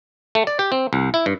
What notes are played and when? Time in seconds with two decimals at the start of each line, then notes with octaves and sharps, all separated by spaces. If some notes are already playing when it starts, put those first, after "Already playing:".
0.35 A3
0.47 D5
0.59 G4
0.72 C4
0.93 C2
1.14 E4
1.26 G2